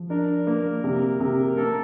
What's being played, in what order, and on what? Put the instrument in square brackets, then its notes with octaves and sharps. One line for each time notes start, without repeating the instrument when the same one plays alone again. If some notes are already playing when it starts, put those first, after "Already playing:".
Already playing: [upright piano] F3
[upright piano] D4 [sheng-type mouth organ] A#4
[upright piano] A#3
C3
C3
[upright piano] A#3 [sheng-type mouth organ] A4